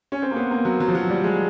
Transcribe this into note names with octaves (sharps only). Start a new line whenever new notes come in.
C#4
C4
A#3
B3
A#3
F#3
F#3
F3
F#3
G3
G#3